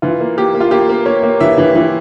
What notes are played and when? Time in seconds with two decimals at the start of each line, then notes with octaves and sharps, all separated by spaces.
0.02 E3 F4
0.21 A#3
0.37 A#3 G4
0.54 A#3
0.60 F4
0.71 A#3 G4
0.89 A#3
1.06 A#3 C#5
1.23 A#3
1.40 E3 E5
1.58 E3
1.75 E3